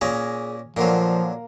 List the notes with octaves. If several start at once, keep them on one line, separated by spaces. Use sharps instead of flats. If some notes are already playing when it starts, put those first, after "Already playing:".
A#2 A#3 C#4 G#4
A#2 D3 F3 F#3 A#3